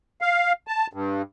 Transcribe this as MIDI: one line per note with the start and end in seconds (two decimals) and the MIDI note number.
0.21 0.53 77
0.67 0.87 81
0.93 1.22 43